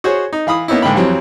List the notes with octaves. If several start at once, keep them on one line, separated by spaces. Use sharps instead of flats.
F#4 G#4 C5 C#5
D#4
E3 F5 B5 D#6
A#3 B3 C#4 D#4 E4
G#2 D3 A#3 G5 B5
F2 E3 F#3 G3 C4